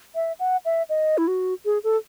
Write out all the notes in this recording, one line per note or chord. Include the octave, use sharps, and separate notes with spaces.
E5
F#5
E5
D#5
E4
F#4
G#4
A4